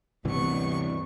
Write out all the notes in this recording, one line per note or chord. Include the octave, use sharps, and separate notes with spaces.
D2 G2 C3 E3 B3 C#6